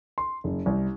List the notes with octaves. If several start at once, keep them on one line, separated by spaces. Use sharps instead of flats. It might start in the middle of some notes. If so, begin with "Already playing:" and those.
C6
F#1
C2